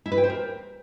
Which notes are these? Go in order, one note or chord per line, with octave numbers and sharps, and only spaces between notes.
E4
B4
G5
C5
A#4